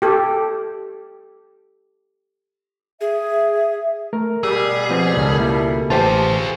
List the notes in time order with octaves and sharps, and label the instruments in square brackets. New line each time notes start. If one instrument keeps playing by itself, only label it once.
[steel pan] G4 A4
[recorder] G#4 [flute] E5
[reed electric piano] A3 [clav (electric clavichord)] A#4
[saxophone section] B2 G3 [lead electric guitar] G#4 [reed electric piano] E6
[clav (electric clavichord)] F3 B3 C4
[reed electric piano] C#2 [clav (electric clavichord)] D#3 C#4 A4
[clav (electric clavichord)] A#3 E4 A4
[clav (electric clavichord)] A1 [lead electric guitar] F4 G#4 [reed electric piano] G4 C5 A5